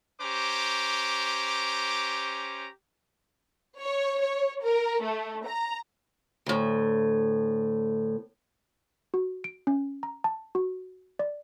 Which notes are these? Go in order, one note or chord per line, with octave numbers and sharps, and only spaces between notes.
C#4 G4 C5 A#5 D6
C#5
C#5
A#4
A3
A#5
D2 A2
F#4
D7
C#4
A#5
A5
F#4
D5